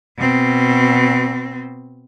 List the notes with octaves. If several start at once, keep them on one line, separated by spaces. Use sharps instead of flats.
B2 C4